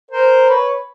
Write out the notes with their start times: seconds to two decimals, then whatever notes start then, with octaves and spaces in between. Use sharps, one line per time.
0.11 A#4 C5
0.49 B4 C#5